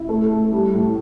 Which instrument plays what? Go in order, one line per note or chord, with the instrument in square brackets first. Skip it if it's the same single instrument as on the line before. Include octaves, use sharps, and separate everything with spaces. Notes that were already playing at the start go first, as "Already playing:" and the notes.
Already playing: [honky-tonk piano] E4
A3
A3
G3
A2